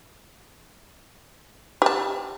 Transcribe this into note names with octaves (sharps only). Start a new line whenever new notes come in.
G4 A5